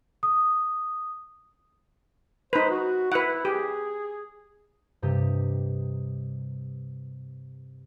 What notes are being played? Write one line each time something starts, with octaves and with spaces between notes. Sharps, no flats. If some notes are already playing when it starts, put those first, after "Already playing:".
D#6
D#4 B4 C5
F#4
E4 B4 F#5
G4 G#4
G2 C3 G4 D#5